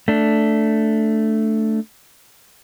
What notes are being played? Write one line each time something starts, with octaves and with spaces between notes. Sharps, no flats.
A3 D4